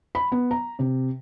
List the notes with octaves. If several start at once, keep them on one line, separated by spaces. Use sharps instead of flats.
B5
B3
A#5
C3